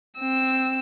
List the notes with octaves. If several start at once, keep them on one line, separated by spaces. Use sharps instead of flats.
C4 E6